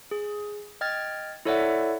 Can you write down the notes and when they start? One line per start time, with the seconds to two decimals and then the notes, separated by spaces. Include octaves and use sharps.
0.11 G#4
0.81 D#5 G5 F6 G#6 A6
1.45 E4 A4 C#5 D5 E5 F#5